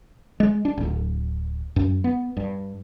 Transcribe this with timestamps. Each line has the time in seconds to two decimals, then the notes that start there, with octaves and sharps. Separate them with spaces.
0.40 G#3
0.65 D4
0.78 D1
1.76 F#2
2.04 B3
2.37 G2